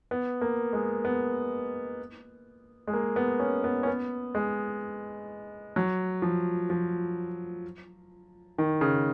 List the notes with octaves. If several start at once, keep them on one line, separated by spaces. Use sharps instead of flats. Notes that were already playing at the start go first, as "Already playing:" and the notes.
B3
A#3
G#3
B3
G#3
A#3
B3
C#4
B3
C#4
B3
G#3
F#3
F3
F3
D#3
C#3